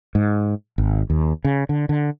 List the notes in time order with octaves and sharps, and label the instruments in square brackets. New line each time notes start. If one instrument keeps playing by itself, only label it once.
[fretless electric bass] G#2
G#1
D#2
C#3
D3
D3